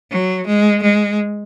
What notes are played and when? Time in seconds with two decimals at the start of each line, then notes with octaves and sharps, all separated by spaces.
0.11 F#3
0.47 G#3
0.83 G#3